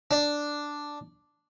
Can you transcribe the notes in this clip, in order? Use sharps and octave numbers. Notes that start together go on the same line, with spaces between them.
D4